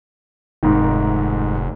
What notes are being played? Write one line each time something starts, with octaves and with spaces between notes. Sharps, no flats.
F1 G#2 D#3